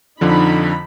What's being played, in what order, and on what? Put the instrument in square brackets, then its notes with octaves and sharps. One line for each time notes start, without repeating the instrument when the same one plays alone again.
[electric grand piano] F2 D3 F3 [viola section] D#4 B5